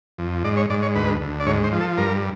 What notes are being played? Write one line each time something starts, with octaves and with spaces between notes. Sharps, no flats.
F2
G#2 D5
C#5
G#2 D5
C#5
D2 B4
D2
D5
G#2 C#5
C5
F3
A4
G2 A#4